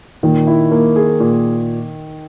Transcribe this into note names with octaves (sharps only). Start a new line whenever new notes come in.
A#2 D#3
E4
A#3
G#4
A#2